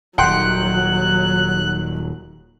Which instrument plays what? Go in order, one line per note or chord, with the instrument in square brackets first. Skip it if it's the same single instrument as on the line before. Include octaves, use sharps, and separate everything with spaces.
[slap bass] D#1 D#3 [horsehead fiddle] F#3 [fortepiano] F#5 G5 C6 [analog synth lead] F#6